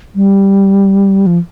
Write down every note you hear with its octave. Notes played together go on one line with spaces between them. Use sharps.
G3
F3